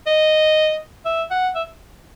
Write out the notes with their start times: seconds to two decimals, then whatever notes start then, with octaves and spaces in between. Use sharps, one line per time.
0.07 D#5
1.05 E5
1.31 F#5
1.55 E5